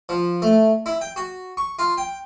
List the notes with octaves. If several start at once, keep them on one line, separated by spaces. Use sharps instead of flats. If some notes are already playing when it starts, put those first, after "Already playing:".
F3
A3
E4
G5
F#4
C#6
F4
G5